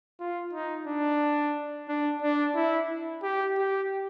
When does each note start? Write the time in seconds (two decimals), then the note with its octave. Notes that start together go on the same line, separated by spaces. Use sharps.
0.20 F4
0.53 D#4
0.87 D4
1.89 D4
2.22 D4
2.56 E4
3.23 G4
3.58 G4